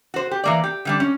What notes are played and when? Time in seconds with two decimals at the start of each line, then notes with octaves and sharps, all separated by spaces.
0.14 F#4 C5
0.31 G4
0.44 E3 A#3 D5
0.64 G4
0.85 D3 G3 D4
1.00 C#4